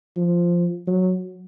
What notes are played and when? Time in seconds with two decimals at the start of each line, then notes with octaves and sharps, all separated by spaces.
0.17 F3
0.87 F#3